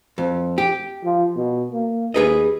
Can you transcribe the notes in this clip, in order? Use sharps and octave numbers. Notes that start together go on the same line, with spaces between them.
F2
G4
F3
B2
A#3
D#2 G#4 B4 D#5